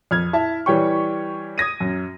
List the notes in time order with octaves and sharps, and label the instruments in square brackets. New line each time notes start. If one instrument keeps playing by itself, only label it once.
[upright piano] F2 F6 G#6
E4 E5 A5
E3 G3 C#5 G5 C#6
D#6 G#6 A#6 D#7
F#2